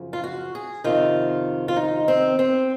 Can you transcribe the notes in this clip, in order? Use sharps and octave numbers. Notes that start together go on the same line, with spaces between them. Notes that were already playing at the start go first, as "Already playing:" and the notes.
Already playing: F#2 C#3 F3
F4
F#4
G#4
F2 C3 D#3 F4
F4
D#4
C4
C4